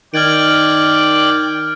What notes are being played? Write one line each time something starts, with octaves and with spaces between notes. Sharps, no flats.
D#3 D5 G5 F6 F#6 G#6 D7